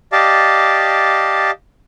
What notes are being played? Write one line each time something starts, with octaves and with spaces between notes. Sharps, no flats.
G4 D5 D#5 F5 A5